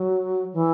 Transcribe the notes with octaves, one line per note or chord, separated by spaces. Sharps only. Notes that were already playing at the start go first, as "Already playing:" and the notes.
Already playing: F#3
E3